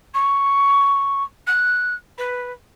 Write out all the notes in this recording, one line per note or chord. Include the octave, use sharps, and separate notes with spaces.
C#6
F#6
B4